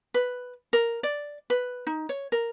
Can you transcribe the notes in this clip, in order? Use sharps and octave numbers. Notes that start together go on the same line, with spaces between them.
B4
A#4
D5
B4
D#4
C#5
A#4